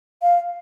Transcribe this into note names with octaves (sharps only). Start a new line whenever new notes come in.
F5